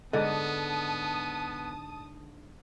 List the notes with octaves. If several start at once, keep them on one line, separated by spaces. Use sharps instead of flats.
G#2 D3 B3 D#5 A5 D#6